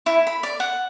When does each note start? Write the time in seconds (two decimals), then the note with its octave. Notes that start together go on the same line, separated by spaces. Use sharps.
0.06 E4
0.27 B5
0.43 D5
0.60 F#5